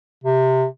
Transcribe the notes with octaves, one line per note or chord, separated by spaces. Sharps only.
C3